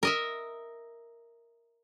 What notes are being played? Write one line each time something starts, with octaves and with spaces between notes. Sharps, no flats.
A#4 D#5 E5